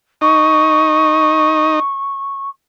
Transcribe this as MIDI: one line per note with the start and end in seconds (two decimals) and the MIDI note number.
0.21 1.80 63
0.21 2.49 85